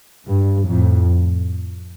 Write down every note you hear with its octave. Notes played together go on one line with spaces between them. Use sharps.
G2
F2 A2